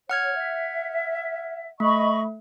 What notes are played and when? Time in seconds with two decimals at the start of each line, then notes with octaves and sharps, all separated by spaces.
0.10 C#5 F#5 F6 G#6
0.35 E5
1.80 A3 D#5 B5 C#6